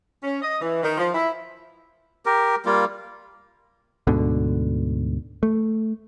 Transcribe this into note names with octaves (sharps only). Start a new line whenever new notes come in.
C#4
D#5
E3
D#3
F3
E4
G4 A#4
G3 A#3 F4
D2 G#2 B2 D3
A3